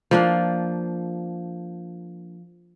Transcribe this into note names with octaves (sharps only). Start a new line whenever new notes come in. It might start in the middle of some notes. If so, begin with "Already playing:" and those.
F3 A#3 D4